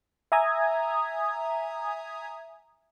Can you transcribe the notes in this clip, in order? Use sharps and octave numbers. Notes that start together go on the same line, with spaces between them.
E5 G#5 A#5 D#6 G#6